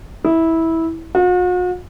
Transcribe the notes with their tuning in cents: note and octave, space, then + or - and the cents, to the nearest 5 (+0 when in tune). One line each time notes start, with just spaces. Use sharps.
E4 -15
F#4 -45